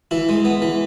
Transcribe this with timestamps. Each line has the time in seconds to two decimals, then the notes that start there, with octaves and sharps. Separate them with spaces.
0.11 E3 E4
0.29 G#3
0.45 B3
0.62 E3